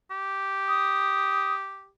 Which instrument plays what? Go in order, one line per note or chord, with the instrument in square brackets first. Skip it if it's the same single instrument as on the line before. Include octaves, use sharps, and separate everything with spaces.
[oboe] G4
[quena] D#6